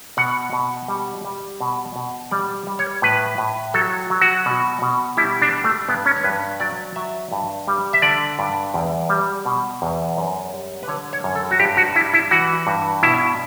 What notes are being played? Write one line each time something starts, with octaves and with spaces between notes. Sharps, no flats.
B2 F#5
B2
G3
G3
B2
B2
G3 D5
G3
C#5
A2 B4
A2
F#3 A4
F#3
F#4
B2
B2
G3 E4
D4
G3
A3
G2 B3
C#4
C#5
G2 B4
F#3 D5
F#3 E5
G2
G3
E5
D3 D5
G2
E2
G3
B2
E2
F#2
G3
B4
D3 C#5
C#5
F#2
A4
F#4
G2 G4
F#4
G3 E4
E4
E3 F#4
G2
B2 E4